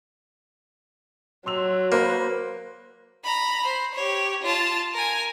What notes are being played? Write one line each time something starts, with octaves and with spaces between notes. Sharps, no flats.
F#3 C6 E6 F7
A#3 B4 C5
A#5 B5
C5
G4 C#5
F4 A5
A#4 G#5